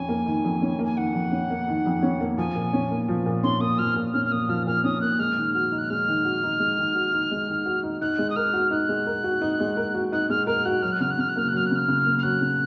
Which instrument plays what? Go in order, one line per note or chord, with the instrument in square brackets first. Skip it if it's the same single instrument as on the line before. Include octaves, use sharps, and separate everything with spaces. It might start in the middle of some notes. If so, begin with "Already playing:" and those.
Already playing: [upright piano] F2 C#4 [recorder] G#5
[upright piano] A#3
D#3
F2
C#4
A#3
[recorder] G#5
[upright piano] D#3 [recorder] F#5
[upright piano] F2
C#4
A#3
D#3
F2
C#4
A#3
[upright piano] F3 [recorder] G#5
[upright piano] A#2
C#4
A#3
F3
A#2
[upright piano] C#4 [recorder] C6
[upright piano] A#3 [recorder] D#6
[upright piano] F3 [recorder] F6
[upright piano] A#2
[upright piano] C#4 [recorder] F6
[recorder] F6
[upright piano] A#3 [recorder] D#6
[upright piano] F3 [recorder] F6
[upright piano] A#2 [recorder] F6
[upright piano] C#4 [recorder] D#6
[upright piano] A#3 [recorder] F#6
[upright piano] G#3 [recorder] F6
[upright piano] D#3
[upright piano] F#4 [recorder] F6
[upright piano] D#4
[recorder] F#6
[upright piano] G#3 [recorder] F6
[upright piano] D#3
F#4
D#4
G#3
D#3
F#4
D#4
G#3
D#3
F#4
D#4
[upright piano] D#4 [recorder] F#6
[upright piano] G#3
[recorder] D#6
[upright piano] A#4 [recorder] F6
[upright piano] F#4
[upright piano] D#4 [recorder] F#6
[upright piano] G#3
A#4
F#4
D#4
G#3
A#4
F#4
[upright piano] D#4 [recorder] F#6
[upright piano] G#3 [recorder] F6
[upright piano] A#4 [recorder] F6
[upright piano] F#4 [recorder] F#6
[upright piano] F#3 [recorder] F6
[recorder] F#6
[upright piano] C#3 [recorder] F6
[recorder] F#6
[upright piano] C#3 [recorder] F6
[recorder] F#6
[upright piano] A#3 [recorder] F6
[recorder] F#6
[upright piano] F#3 [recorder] F6
[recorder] F#6
[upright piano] C#3 [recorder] F6
[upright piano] C#3
A#3
[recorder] F6
[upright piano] F#3 [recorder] F#6
[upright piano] C#3